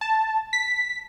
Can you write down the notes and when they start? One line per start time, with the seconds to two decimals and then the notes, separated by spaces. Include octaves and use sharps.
0.01 A5
0.53 B6